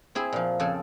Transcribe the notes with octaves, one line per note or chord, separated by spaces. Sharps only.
C4 E4 G#4
A#2 F3
F2 C#3 C4 A4 G#5